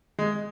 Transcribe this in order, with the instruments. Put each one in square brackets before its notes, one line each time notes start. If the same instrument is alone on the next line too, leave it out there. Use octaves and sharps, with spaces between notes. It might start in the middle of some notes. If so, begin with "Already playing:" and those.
[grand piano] G#3